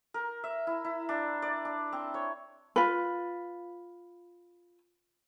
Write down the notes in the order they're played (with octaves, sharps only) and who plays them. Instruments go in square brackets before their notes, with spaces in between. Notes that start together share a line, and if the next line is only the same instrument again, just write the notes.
[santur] A#4
E5
E4
E4
D4
D5
D4
C4
C#5
[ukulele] F4 B4